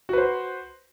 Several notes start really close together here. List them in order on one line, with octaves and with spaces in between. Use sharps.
F#4 B4 C5